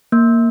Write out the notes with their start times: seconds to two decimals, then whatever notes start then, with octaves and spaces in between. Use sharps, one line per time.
0.12 A#3